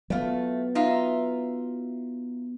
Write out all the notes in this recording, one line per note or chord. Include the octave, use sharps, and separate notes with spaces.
F#3 A3 B3 F4
D#4 F4 E5